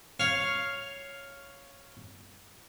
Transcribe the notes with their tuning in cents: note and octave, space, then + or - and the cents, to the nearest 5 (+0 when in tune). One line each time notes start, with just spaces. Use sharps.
C#5 +0 F5 +0